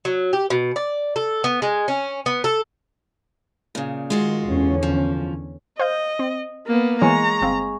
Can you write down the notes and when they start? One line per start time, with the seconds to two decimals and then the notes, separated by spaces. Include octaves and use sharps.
0.05 F#3
0.33 G4
0.50 B2
0.76 D5
1.16 A4
1.44 B3
1.62 G#3
1.88 C#4
2.26 B3
2.44 A4
3.75 A#2 C#3
4.10 D#3 G#3 F4 F#4
4.46 E2 D3 C#4
4.83 F3
5.79 C5 D#5 F5 G6
6.19 C4
6.67 A#3 B3
7.01 E3 G#3 B3 C#5 G#5 A#5 C#6
7.42 G1 C4 F5